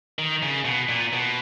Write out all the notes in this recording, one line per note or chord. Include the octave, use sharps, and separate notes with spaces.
D#3
C#3
B2
A#2
B2